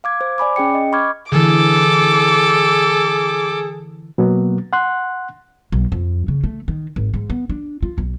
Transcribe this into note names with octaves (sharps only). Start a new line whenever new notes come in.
F5 D6 G#6
C5
D5 G#5 B5 D6
C#4 G#4 G5 C#7
D#5
B5 C#6 D6 F6 G#6
D3 E3 G#4 A4 D6
B2 F#3 A#3 B3
F#5 C6 F#6
B1
F2
C#3
A3
D#3
G#1
G#2
B3
D4
F4
B1